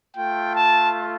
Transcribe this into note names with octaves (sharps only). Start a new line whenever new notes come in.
A3 F4 G5
A5